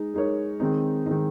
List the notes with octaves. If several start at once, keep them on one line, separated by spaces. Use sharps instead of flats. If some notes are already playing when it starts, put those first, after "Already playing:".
Already playing: G#3 D#4
G#3 D#4 A#4 C#5
D#3 G#3 C4 D#4
D#3 G#3 C4 D#4